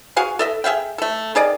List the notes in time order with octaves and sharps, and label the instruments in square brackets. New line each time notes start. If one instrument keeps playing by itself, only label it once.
[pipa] F#4 G#4 F5 G#5
A4 D#5 E5
G#4 E5 F5 G5
A3 A4
D#3 G#4 D5 D#5